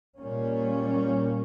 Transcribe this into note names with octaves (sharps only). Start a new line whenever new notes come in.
A#2 G3 A#3 C#4